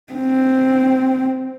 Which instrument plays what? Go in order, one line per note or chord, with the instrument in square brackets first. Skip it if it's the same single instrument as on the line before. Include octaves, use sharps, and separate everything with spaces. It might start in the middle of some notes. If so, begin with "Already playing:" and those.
[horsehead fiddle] C4